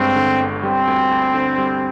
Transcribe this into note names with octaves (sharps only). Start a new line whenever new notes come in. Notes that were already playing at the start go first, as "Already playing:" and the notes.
Already playing: G1 G2 D3 G#3 C4
D3
G1
G3 C4
D2
D2
D3
G3